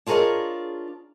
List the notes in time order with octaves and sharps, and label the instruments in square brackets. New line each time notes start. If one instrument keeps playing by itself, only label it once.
[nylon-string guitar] D4 F4 G#4 A#4 C#5 D#5